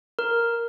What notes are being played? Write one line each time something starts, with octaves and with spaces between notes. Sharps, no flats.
A#4